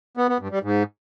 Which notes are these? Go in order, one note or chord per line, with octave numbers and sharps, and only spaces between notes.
B3
B3
G2
G3
G#2